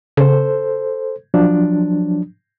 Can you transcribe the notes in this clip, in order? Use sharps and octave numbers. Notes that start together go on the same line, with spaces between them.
C#3 A4 C5
F3 F#3 D4